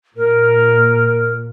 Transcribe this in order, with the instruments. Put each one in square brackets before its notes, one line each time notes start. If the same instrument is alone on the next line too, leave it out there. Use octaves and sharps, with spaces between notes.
[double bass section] A#2 [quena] A#4